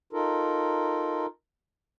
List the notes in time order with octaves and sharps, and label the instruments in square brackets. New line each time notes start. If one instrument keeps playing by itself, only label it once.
[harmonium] D#4 F4 A4 A#4